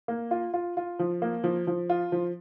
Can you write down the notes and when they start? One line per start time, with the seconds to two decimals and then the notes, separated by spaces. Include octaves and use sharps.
0.08 A#3
0.31 F4
0.54 F4
0.77 F4
0.99 F3
1.22 A#3
1.44 F3
1.67 F3
1.90 F4
2.12 F3